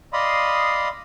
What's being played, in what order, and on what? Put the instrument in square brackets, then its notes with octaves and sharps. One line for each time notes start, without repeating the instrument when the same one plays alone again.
[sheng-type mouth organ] D5 D#5 F5 B5 C6 D#6